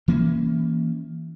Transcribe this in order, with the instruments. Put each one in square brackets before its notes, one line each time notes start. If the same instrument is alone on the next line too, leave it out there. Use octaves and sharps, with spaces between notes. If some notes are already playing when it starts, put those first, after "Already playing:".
[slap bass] E3 A#3 C#4